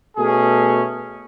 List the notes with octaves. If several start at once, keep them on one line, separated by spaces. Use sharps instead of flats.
B2 A3 C#4 G#4